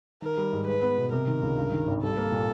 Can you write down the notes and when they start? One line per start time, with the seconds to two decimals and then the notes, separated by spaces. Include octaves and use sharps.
0.22 D#3 A#4
0.37 G3
0.53 G#2
0.67 G#3 B4
0.82 B3
0.98 B2
1.12 C3 A#4
1.27 D#3
1.42 C#2
1.57 G2
1.72 D#3
1.87 G#1
2.02 G3 A4
2.17 A#3
2.32 A#2